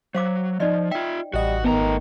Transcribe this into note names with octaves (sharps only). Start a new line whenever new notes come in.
F#3 C5 F5 D6
F3 D#4 D5 D#5
F4 E5 G5
A1 G3 F#4 D#5 F#5
G#1 D#3 A3 B3 A5 A#5